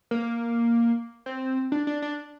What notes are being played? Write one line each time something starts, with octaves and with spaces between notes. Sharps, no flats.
A#3
C4
D4
D4
D4